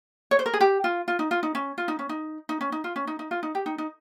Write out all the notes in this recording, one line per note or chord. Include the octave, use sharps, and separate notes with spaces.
C#5
C5
A#4
G#4
G4
F4
F4
D#4
F4
D#4
C#4
F4
D#4
C#4
D#4
D#4
C#4
D#4
F4
C#4
D#4
D#4
F4
D#4
G4
D#4
D#4